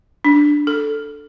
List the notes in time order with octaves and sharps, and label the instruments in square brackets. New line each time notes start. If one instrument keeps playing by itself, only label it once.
[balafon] D4
A4